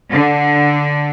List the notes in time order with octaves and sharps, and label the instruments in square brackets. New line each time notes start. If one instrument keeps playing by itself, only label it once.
[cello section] D3